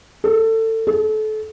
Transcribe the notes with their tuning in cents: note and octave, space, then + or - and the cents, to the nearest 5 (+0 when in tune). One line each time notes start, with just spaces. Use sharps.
A4 +25
A4 -30